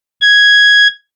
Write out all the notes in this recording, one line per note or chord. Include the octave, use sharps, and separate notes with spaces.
G#6